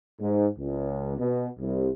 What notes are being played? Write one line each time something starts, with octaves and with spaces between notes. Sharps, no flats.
G#2
C#2
B2
C2